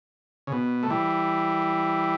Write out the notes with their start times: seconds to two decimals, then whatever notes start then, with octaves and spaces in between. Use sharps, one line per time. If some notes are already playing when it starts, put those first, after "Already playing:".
0.47 C#3
0.52 B2
0.83 A3
0.90 E3 G3